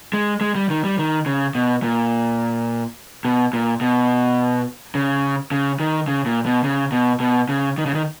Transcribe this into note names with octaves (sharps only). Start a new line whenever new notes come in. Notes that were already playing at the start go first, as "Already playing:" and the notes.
G#3
G#3
G3
D#3
G3
D#3
C#3
B2
A#2
B2
A#2
B2
C#3
C#3
D#3
C#3
A#2
B2
C#3
B2
B2
C#3
D#3
C#3
D#3